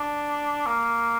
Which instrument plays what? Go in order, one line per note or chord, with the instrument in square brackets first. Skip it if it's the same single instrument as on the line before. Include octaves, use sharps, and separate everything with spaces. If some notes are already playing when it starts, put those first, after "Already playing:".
Already playing: [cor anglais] D4
A#3